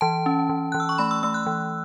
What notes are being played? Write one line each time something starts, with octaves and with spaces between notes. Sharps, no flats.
E3 A5
C#4
E3
E3 F#6
E6
C#6
A3 B5
E6
A3 E6
F#6
E3